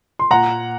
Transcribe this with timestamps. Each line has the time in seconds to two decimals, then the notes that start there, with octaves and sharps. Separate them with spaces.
0.19 C6
0.31 A#2 F#5 A#5